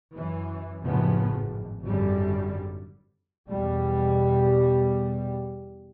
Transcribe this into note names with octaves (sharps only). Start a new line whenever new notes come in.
F#2 E3
F1 F#2 A2 C#3 F3 B3
G#1
G#1 F#2 D3 G3
E2 B2 G3